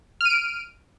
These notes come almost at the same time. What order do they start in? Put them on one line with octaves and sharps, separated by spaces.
F6 D#7 D7